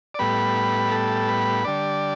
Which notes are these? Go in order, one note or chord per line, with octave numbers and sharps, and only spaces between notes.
D5
A2 G3 B3 B4
A4
B4
D3 G3 D4 D5